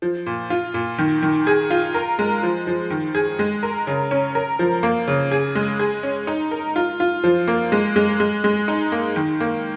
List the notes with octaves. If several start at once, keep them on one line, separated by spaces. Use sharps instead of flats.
F3
A#2
F4
A#2
D#3
D#3
G#4
F4
A#4
G#3
F3
F3
D#3
G#4
G#3
A#4
C#3
C#4
A#4
F3
A#3
C#3
G#4
G#3
G#4
C#4
D#4
A#4
F4
F4
F3
A#3
G#3
G#3
G#3
G#3
D#4
A#3
D#3
A#3